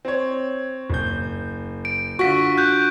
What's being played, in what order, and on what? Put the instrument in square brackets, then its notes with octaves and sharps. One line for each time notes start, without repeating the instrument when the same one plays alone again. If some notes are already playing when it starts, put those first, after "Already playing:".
[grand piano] C4 C#5
F#1 G6
[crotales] D7
[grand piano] D3 F4 F#4 [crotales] C#6 B6
[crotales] F#6 G6